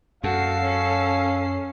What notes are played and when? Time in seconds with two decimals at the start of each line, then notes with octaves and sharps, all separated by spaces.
0.24 F#2 F#4 A4 F5 C7
0.62 C#4